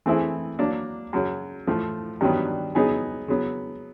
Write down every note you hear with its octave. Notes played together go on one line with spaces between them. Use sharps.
E3 A3 C4 E4 G#4
F#3 A#3 D4
F#2 C#3 F#3
A2 F3 A3
G2 D#3 F#3 B3
C#3 F#3 B3 D#4 G#4
C#3 F#3 B3